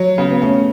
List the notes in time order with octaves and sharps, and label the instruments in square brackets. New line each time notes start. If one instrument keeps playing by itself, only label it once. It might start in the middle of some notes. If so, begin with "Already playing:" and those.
Already playing: [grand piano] F#3
[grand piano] C#3 [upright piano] B3
[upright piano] B3
[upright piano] A3 [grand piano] C#4